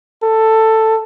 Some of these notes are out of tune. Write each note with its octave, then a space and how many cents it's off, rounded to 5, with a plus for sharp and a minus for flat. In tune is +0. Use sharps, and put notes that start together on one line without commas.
A4 +10